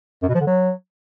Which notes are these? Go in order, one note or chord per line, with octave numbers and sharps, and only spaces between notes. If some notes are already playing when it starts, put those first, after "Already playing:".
F#2
B2
F3
D3
F#3